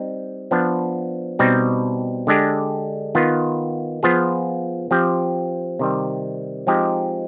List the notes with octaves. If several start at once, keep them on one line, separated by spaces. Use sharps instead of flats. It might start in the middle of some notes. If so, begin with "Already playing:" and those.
Already playing: G3 C4 D#4
F3 B3 D4
B2 G3 C4 D#4
D3 G#3 D4 G4
D#3 B3 F4
F3 B3 F4 G#4
F3 C4 G4
C3 D#3 G3
F3 G#3 C4 D#4 G4